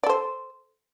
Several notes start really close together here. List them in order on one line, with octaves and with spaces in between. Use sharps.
D5 A4 C5